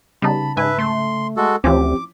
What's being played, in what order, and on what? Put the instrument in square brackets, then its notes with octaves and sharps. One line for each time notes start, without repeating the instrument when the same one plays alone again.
[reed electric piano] C#3 A5 [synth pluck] G3 B3 D#4 [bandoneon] B5
[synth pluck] G#2 G#5 [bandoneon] B4 E5
[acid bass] A3 [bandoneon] C6
[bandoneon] G#3 F#4 A4
[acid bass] D2 [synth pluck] E3 F3 C#4 [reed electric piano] C4 G4 [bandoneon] D6